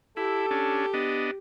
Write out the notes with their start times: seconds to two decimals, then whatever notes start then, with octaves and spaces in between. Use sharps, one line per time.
0.17 E4 G4 A4
0.51 C#4 D4
0.94 B3 D4 D#5